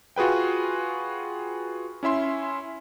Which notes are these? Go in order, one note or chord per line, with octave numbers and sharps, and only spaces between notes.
F4 F#4 G#4 B4 G5
C#4 E4 E5 C6